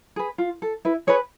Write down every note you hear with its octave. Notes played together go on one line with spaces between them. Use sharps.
G#4 B4
F4
A4
E4 B4
G#4 B4 C#5